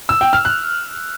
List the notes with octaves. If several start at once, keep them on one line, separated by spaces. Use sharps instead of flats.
E6
G5
F6
F#6